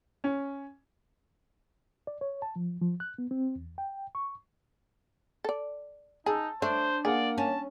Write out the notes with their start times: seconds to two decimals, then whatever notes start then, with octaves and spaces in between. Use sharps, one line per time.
0.24 C#4
2.07 D5
2.21 C#5
2.42 A5
2.56 F3
2.81 F3
3.00 F#6
3.18 B3
3.31 C4
3.56 E2
3.78 G5
4.15 C#6
5.44 A4 D5
6.26 D#4 G#4 A5 E6
6.62 A3 D4 C5
7.05 A#3 G#4 D5 F5 F#5
7.38 C#4 A5